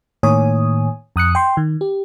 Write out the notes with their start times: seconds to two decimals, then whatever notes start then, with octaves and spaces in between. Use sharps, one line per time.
0.23 A2 D#3 A#3 C#5 G#5 D#6
1.16 F2 D#6 F#6 C#7
1.35 G5 C6
1.57 D#3
1.81 G4